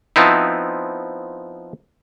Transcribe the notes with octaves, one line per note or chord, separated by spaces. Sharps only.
F3 B3 C4 D#4 E4